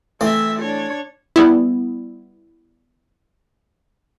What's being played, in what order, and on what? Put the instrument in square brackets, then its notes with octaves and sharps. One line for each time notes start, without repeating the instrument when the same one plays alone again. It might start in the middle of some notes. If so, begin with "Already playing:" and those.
[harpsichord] E3 A3 C4 [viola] E4 E5
[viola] D4 C#5
[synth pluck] G3 B3 E4